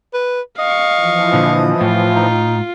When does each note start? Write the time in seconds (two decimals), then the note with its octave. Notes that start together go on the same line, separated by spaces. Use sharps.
0.14 B4
0.59 D#5 F5 C#6
0.98 E3 F3
1.33 A#2 D3
1.81 A2 F4
2.16 D#4